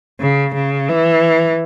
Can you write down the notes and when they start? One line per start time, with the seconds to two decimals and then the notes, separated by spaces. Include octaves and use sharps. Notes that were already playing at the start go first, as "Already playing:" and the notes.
0.21 C#3
0.55 C#3
0.89 E3